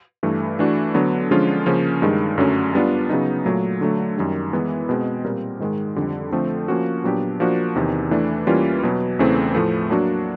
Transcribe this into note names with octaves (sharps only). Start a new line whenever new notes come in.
G2 E3 A3
E3 A3 D4 F#4
D3 F#3 B3
D3 F3 G#3 C#4 F4
C#3 F3 A#3 C#4
G2 D#3 G#3
F#2 D3 F#3 A3 C#4
G3 B3 D4 F4
C#3 F#3 B3 D#4
A#2 F#3 A3
D3 F#3 A3
F#2 D#3 G3
E3 G#3 B3 E4
B2 G#3 C4
A#2 G3 C4 F4 A#4
G#2 D#3 G#3
F2 D3 G3
D3 F3 A3 C4
F3 A#3 C#4 F#4
A#2 F#3 B3 D4 G4
F3 A#3 D4 F#4
E2 C3 D#3
E3 A3 D4
E3 G3 A#3 C#4 F4
B2 F#3 B3
E2 C#3 E3 A3 C4
A2 F3 A3
F#3 A#3 D4 F#4